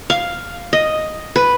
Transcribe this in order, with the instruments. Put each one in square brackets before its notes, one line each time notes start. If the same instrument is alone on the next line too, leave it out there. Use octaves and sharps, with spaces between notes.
[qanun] F5
D#5
B4